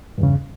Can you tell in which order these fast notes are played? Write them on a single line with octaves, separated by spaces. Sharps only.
G2 E2 C#3